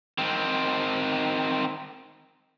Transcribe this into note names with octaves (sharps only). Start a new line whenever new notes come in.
D#3 C4